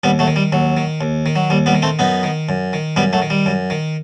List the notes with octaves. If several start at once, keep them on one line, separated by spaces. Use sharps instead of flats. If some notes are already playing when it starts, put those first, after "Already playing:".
D#2 G3 B3
F#3 A3
D#3
G3
D#2 F#3
D#3
D#2
D#3
F#3
D#2 G3
G3 B3
D#3
A3 C4
F#2 B3 D#4
D#3
F#2
D#3
F#2 G3 B3
F#3 A3
D#3
G3
F#2
D#3